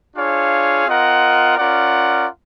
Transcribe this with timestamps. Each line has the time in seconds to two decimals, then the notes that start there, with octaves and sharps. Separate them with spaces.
0.16 D4 F4 G#4 C#5 F5
0.86 C4 F4 A#4 D#5 F#5
1.57 C#4 F4 A#4 D5 F#5